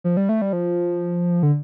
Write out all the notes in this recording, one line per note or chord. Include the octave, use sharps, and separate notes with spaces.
F3
G3
A3
G3
F3
D3